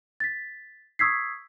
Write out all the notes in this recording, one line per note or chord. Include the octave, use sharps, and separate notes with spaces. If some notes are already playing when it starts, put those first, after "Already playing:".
A6 B6
C#6 D#6 E6 G#6 B6 C7